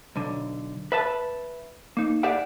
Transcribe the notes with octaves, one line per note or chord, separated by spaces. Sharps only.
B1 D3
B4 E5 A5
A#3 D#4
G4 G#4 D5 E5 F#5